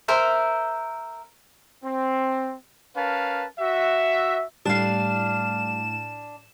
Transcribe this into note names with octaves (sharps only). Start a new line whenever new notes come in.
A#4 C5 E5
C4
C#4 A#4 B4 F5 A5
F#4 E5
A2 G3 D4 F5 E7